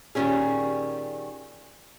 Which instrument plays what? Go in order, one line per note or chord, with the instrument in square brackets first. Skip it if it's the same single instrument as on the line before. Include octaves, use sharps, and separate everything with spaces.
[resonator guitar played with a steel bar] A#2 D#3 G3 G#3 C#4 G#4